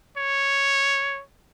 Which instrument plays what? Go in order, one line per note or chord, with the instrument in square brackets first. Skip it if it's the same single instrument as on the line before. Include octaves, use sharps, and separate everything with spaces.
[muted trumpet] C#5